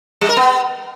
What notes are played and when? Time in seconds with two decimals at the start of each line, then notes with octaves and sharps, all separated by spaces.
0.21 G3
0.29 A#4
0.37 B3